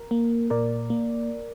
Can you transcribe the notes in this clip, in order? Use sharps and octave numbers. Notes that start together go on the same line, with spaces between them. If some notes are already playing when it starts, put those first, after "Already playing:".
Already playing: A#4
A#3
A#2 A#4 D5
A#3